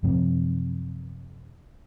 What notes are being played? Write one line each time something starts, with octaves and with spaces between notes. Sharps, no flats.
F#2 C3 F3 C4